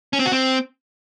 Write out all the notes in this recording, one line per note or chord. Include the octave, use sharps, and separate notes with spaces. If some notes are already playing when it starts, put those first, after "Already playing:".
C#4
C4
F#4
C4